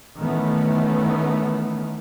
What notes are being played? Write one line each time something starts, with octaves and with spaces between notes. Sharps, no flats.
D#3 E3 A3 B3 C#4